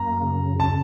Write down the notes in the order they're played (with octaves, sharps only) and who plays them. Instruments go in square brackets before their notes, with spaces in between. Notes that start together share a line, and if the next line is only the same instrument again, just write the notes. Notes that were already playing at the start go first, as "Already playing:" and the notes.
Already playing: [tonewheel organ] F#2 A#3 [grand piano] A#5
[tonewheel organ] C#3
[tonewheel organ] C#3 [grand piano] A5